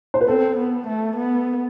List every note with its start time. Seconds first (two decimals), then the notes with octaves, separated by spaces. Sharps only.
0.14 C5
0.21 B4
0.28 C4 A4
0.57 B3
0.87 A3
1.16 B3